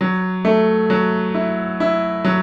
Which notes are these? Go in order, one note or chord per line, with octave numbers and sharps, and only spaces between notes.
F#3
A3
F#3
E4
E4
F#3